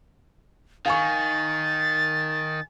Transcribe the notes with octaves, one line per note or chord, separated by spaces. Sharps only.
D#3 F5 G#5 C#6 A6